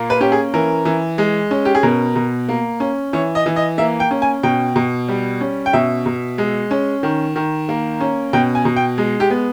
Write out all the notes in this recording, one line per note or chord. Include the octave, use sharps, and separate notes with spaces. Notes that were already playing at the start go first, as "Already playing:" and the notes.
Already playing: A#2 A#3
B4
C#4 G4
G#4
E3 A#4
E3
G#3
C#4
G4
G#4
B2 A#4
B2
A#3
C#4
E3 C#5
D#5
E3
D#5
A#3 E5
G5
C#4
G#5
B2 G5
B2
G3
C#4
G5
B2 E5
B2
G#3
C#4
D#3
D#3
A#3
C#4
B2 G5
G#5
B2
G5
G#3
G4
B3